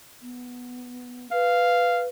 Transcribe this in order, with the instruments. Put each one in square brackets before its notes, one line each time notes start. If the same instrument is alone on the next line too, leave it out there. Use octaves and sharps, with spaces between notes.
[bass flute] B3
[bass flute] B4 [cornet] F5